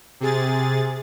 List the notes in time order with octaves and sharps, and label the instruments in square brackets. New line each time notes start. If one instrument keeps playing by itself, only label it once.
[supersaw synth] C3 G#4 A6